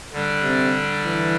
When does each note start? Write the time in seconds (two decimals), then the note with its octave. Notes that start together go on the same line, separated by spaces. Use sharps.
0.12 D3 G3 D4
0.43 C3
1.05 E3